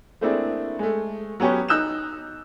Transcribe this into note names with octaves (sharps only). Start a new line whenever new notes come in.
A3 A#3 C4 D4 E4 G#4
G#3 A3
F#3 B3 C#4 G4 C#5
D#4 E6 F#6 G6 E7